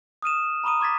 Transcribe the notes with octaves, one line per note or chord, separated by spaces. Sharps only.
D#6 F6 D#7 E7
A#5 B5 C#6 D#6 D#7
C6 D6 G#6 A6 B6